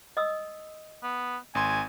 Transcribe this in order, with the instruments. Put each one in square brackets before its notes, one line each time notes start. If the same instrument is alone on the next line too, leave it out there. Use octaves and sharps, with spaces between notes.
[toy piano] D#5 D#6 E6
[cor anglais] B3
[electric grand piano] G#1 C6 [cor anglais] G#5